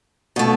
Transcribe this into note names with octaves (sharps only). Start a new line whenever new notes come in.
B2 A3